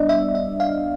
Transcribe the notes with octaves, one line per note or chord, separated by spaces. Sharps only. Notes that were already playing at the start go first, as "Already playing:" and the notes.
Already playing: G3 B3 D4 D5 D#5
E5
E5
F5